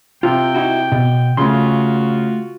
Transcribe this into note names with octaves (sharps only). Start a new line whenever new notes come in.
C3 F4 G5
D#4 E4 F#4
B2
C#3 A3 F4 F#4 C6